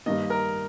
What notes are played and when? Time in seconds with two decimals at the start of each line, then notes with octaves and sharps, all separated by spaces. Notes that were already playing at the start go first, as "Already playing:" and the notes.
0.06 G2 D#3 A#3 D#5
0.30 A#4